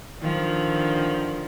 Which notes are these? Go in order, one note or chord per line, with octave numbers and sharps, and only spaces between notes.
D3 D#3 F3